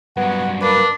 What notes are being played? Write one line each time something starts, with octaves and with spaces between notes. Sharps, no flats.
G2 F#3 B3 F#5
A#3 D4 B4